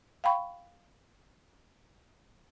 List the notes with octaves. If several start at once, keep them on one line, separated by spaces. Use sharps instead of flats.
F5 G5 B5 C#6